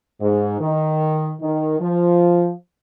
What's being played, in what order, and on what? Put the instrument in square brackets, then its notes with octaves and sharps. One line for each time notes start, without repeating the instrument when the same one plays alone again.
[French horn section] G#2
D#3
D#3
F3